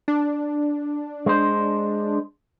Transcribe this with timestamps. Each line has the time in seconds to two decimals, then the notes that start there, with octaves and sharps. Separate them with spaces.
0.08 D4
1.26 G#3 C5